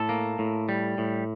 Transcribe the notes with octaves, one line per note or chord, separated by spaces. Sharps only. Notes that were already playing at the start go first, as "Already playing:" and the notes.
Already playing: A2 A4
A#3
A2
G3
A2